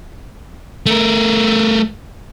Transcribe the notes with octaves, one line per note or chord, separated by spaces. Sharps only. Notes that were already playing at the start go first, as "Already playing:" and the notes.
A3 A#4